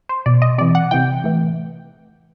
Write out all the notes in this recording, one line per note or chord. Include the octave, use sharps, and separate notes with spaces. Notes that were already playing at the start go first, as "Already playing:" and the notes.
C5
B2 D5
D#5
C3 E3 D5
F#5
C3 E3 G5
A2 E3